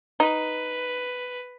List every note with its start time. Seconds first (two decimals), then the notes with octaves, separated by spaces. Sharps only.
0.20 D#4 B4